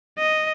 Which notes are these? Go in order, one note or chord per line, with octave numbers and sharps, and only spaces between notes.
D#5